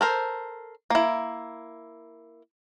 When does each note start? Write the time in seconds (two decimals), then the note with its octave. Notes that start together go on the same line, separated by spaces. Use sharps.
0.01 A4 A#4 C5
0.90 A#3 E4